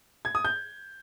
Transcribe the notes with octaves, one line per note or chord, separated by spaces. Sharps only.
G#6
D#6
G6